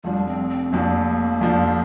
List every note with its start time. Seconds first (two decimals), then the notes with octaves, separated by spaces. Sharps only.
0.04 F1 F2 F3 G3 D4
0.27 C4
0.49 C4
0.72 F1 F2 F3 A#3 D4
1.41 F1 F2 F3 D4